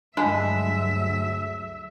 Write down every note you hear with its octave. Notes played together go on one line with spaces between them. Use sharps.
D2 G2 F#3 G#3 D4 E5 B5